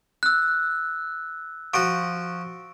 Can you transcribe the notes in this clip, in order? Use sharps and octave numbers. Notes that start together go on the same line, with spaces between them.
E6 F#6
F3 F#4 C#6 D7